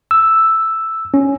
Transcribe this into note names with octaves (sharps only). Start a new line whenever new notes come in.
E6
C#4